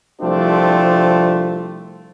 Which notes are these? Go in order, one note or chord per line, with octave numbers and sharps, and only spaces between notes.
C2 F3 A3 C4 D4 F4